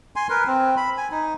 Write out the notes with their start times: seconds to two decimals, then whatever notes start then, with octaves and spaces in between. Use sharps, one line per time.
0.16 G#5 C6
0.30 A#4 B4
0.47 C4
0.77 B5
0.97 G#5
1.11 D#4